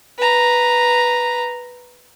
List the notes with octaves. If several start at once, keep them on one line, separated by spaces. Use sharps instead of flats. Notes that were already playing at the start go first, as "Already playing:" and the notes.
B4 A#5